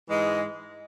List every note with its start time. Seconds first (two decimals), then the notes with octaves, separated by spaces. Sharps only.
0.09 G#2 E3 G#3